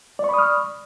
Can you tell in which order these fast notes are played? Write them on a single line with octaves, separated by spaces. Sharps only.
D5 C#6 B5 D#6 F6